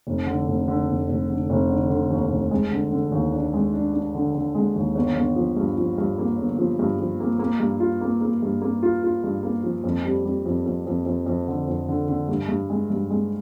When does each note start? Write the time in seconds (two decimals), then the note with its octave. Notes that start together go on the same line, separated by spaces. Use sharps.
0.07 F1
0.27 D3
0.48 F1
0.68 D3
0.88 F1
1.09 F1
1.29 D3
1.50 F1
1.69 D3
1.90 D3
2.10 D#2
2.30 F1
2.51 G#3
2.71 D3
2.92 D3
3.12 D#2
3.33 D4
3.53 G#3
3.74 D4
3.93 D4
4.15 D3
4.35 D3
4.55 G#3
4.76 D#2
4.95 G1
5.16 G1
5.36 F3
5.57 G2
5.78 F3
5.98 G2
6.18 A#3
6.38 G1
6.58 F3
6.79 G2
6.99 F3
7.20 A#3
7.39 A#3
7.60 G2
7.80 F4
8.01 A#3
8.21 A#3
8.42 G2
8.61 A#3
8.83 F4
9.03 F4
9.24 G2
9.43 A#3
9.64 F3
9.84 F2
10.05 G3
10.25 G3
10.46 F2
10.66 F2
10.87 F2
11.06 F2
11.26 F2
11.48 D3
11.68 F2
11.88 D3
12.09 D3
12.28 G2
12.48 G2
12.70 G#3
12.90 G2
13.10 G#3